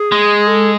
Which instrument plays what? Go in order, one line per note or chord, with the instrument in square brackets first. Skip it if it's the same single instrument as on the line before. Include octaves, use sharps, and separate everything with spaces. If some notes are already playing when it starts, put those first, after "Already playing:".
Already playing: [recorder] G#4
[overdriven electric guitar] G#3
[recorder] A4